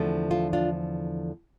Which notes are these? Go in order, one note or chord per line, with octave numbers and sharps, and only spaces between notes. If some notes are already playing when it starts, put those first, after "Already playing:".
Already playing: E2 D3 F3 A3
F4 A4
D4 F4